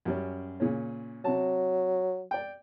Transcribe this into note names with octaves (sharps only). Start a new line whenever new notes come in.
F#2 G3 C#4
A#2 C#3 C#4
C3 F#3 A5
D5 G5